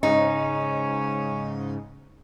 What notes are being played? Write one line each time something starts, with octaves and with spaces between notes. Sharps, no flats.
G#2 C#3 C#4 D#4